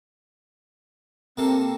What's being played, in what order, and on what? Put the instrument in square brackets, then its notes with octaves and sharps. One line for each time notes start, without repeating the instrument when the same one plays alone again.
[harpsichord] C3 A#3 A4 [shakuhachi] C4